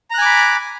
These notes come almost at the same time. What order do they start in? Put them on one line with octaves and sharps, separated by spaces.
A#5 F#6 G#5 D6 B5